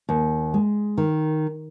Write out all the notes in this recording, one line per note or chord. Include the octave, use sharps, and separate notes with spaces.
D#2
G#3
D#3